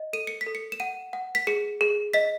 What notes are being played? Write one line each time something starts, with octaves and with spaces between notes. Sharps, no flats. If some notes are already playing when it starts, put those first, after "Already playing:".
Already playing: D#5
A4 D#7
C#7
B6
A4
C#7
E7
F#5 D#7
F#5
B6
G#4 C#7
G#4
D#5 B6